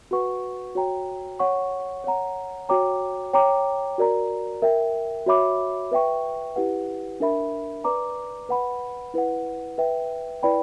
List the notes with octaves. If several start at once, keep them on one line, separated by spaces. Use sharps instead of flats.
F#4 B4 F#5 C#6
F#4 C#5 G5 A#5
C#5 F#5 C#6
C#5 F#5 A#5
F#4 C#5 G5 A#5 D6
C#5 G5 A#5 D6
F#4 A#4 D5 A#5
A#4 E5 G5
F#4 C#5 E5 B5 D6
B4 E5 G5 C#6
E4 G4 B4 F#5
D4 A#4 E5 B5
B4 D5 A#5 D6
B4 F#5 B5
E4 B4 F#5
B4 E5 G5
E4 B4 D5 G5 B5